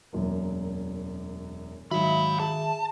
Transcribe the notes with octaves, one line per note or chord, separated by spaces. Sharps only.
E1 F#2 A#3
G#2 D#3 F#3 E5 F5 B5
G#4 A5